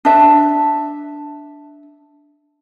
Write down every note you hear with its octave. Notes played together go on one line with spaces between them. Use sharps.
D4 E5